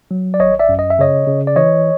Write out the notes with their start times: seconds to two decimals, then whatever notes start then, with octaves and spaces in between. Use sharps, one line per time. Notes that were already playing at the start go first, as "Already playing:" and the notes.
0.11 F#3
0.34 D5
0.40 G#1 C#5 D#5
0.59 D5 E5
0.69 F#2
0.79 D#5
0.90 E5
0.99 C#3 C#5 D#5
1.27 C#3
1.47 D5
1.56 E3 C#5 D#5